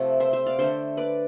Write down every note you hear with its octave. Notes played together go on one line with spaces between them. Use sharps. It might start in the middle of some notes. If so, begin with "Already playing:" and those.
Already playing: C3 F3 A3 F5
C5 E5
C5 E5
D5 F5
D3 A3 C5 E5
B4 D5